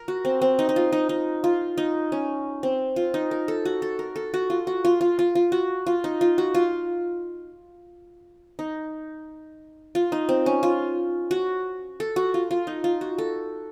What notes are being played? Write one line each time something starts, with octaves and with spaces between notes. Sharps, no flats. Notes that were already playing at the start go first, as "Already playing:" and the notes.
Already playing: A#4
F#4
C4
C4
D#4
D#4
F4
D#4
D#4
F4
D#4
C#4
C4
F4
D#4
A#4
A4
F#4
A4
A#4
A4
F#4
F4
F#4
F4
F4
F4
F4
F#4
F4
D#4
F4
F#4
F4
D#4
F4
D#4
C4
C#4
F4
F#4
A4
F#4
F4
F4
D#4
F4
F#4
A4